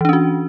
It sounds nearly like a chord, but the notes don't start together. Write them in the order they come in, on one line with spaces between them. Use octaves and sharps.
E3 D4 C#4 F#4